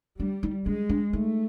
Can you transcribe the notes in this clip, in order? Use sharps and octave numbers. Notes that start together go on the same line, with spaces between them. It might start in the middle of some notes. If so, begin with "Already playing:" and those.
G3 D4
D#4
G#3 D4
D4
A3 D#4